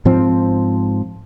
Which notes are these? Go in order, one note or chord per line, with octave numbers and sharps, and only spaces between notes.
G#2 F3 C4